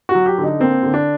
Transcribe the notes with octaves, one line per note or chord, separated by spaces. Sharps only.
F#4
F#3
G4
D3 D#4
A#3 C4
D3
D4